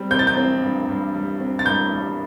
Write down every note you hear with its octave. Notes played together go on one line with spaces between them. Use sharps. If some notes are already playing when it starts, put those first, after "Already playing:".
Already playing: G3 C4
C4 G6
A6
G6
C4
G2
G2
G3
C4
A6
G2 G6
G3